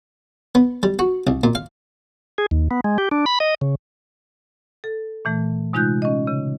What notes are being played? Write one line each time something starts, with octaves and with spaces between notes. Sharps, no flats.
B3
G3
F#4
C2
A#2
F5
G#4
D#2
B3
G#3
G4
D4
B5
D#5
C#3
A4
A#2 E3 A3
C3 G#3 D#4 F4 F#6 G6
C#4 D#5
C#3